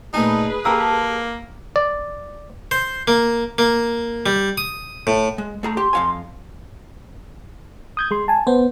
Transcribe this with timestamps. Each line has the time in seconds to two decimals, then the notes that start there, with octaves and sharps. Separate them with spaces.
0.14 A#2 A3 D#4 G#4 B4 G#5
0.65 A#3 G4 A4 G5 A#5 E6
1.76 D5
2.71 C5
3.08 A#3
3.58 A#3
4.26 G3
4.58 D#6
5.07 A2
5.38 G#3
5.63 A3 G#4 A#5
5.77 G4 C6
5.93 F2 F5 G#5
7.97 D#6 G6 G#6
8.11 G#3 C6
8.28 G#5 A5
8.47 B3 C5